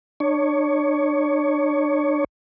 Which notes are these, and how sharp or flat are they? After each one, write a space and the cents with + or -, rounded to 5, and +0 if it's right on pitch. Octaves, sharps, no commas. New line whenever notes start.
D4 +35 C#5 +10